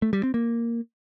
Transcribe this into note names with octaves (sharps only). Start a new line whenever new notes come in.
A3
G3
C4
A#3